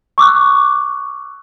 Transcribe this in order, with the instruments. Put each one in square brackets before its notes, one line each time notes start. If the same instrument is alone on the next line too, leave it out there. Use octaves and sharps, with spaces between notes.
[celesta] C#6 D6 E6 F#6